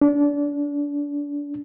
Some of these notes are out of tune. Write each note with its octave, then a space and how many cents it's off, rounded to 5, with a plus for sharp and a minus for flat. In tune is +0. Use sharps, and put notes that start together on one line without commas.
D4 -30